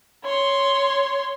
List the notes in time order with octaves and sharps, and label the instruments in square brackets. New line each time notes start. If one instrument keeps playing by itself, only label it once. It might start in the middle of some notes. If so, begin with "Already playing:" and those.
[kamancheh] C#5 C6